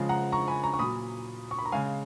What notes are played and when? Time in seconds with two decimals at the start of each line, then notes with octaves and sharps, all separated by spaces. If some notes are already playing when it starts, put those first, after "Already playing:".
Already playing: C#3 F3 G#3
0.09 F#5 A#5
0.32 A#5 C#6
0.48 G#5 B5
0.63 A#5 C#6
0.74 C#6
0.79 A#2 F#3 B5 D#6
1.51 C#6
1.59 B5
1.65 A#5
1.72 C#3 G#3 F5 G#5